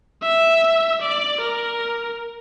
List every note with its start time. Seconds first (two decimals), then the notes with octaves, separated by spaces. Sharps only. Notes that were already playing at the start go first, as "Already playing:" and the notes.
0.22 E5
1.01 D5
1.41 A#4